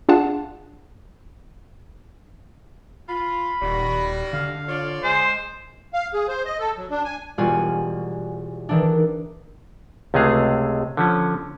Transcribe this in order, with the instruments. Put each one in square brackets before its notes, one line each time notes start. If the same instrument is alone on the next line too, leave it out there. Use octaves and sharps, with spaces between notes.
[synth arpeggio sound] D4 F4 G#4 F5 F#5 A5
[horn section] F4 [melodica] B5
[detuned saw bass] D#1 [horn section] D#3 G3 F#4
[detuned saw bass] D3 [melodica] F5
[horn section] F4 C#5 D5
[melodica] G#3 G#4 [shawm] C5
[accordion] F5
G#4
C5
D#5
A4
F#3
D4
G#5
[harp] E1 G3 F4 F#4 G#5
D#3 E3 D4
[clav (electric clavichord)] C#2 C3 G#3 A3 G#4 F5
D3 F3 C#4